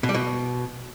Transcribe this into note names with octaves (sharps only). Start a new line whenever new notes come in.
B2
G3
B2